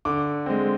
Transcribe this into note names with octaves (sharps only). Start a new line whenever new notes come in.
D3 D6
G#3 C4